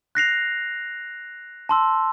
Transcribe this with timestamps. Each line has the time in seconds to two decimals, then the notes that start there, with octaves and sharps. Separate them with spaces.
0.15 F#6 A#6 C7 F7
1.69 A5 C6 E6